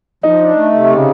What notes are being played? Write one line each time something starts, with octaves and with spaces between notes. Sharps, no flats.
F3 D#4
D4
A3
C3
C#3